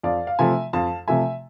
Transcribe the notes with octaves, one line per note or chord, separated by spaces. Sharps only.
F2 D5 F5
F5
C3 F3 A3 E5 G#5
F2 F5 A5
C3 F3 A3 E5 G#5